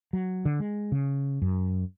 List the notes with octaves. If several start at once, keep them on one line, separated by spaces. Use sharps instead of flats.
F#3
D3
G#3
C#3
F#2